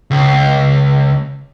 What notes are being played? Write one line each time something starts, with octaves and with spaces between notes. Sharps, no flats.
C#2